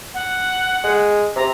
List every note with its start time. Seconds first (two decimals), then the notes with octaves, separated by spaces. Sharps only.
0.14 F#5
0.84 G#3
1.36 C3 A#5